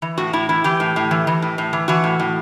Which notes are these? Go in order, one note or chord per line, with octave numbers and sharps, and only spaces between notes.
E3
A2 F#4
A2 E4
E3 E4
E3 G4
A2
A2
E3
E3
A2
A2
E3
E3 F#4
A2
A2